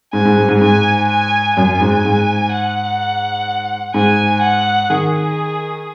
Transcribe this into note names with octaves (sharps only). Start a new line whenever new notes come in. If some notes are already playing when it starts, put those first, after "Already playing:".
G#2 G#5
G#2
G#2
G#2
G#2 G#5
G#5
F#2 G#5
G#2
G#2
F#5
G#2 G#5
F#5
D#3 G#4